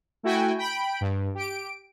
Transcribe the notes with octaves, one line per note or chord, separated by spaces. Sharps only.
A3 E4 F#4 G5 G#5
G5 B5 D7
G2
G4 D7